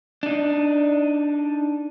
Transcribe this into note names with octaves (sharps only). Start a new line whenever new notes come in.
D4 D#4